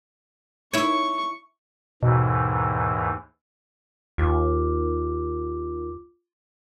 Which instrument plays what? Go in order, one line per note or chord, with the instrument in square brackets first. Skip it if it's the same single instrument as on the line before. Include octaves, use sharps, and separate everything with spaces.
[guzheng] E4 C#5 [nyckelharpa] C#6
[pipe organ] D#2 G#2 E3 [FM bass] B2
[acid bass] D#2 [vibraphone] F4 D6